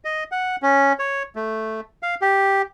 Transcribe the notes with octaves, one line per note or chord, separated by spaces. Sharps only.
D#5
F#5
C#4
C#5
A3
F5
G4